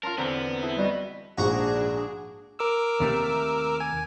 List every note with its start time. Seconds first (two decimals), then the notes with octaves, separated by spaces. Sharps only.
0.03 C#4 F4 A#4 A5 C6 F6
0.18 E2 D3 B3 C4 D4 A4 A#5
0.62 E4 G#4 A5
0.78 G3 F#4 D#5
1.38 A#1 G#2 D4 F#4 G#4 A#5 C#6
2.59 A#4 D6 E6
3.00 D#2 C3 A3
3.80 G#5